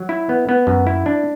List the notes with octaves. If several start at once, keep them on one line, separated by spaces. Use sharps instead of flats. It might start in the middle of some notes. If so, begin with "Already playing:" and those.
Already playing: F#3
E4
B3
B3
F#2
E4
D4